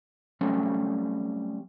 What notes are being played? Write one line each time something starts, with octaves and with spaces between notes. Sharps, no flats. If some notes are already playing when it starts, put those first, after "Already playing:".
F#3 G3 A3 C4 C#4